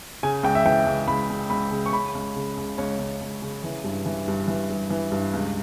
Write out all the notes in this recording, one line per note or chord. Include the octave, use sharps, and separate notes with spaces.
C#3 G#5
C#2 G5
E5
E3 G5
C#2
C#2 B5
C#2
C#2 B5
C#3
C#6
C#3 B5
C#2
C#3
C#2
C#2 C#5
C#2
C#2
C#3
E3
G2
E3
G2
E3
G2
E3
G2
C#2